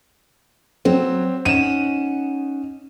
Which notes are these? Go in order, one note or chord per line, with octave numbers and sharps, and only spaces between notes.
F#3 C4
C#4 D#4 F#5 D#7 E7